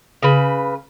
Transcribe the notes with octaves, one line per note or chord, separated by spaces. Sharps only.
C#3 B4